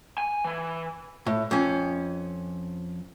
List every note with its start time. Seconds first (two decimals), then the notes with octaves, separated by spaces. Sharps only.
0.18 G#5
0.45 E3
1.27 A2
1.51 F2 C#4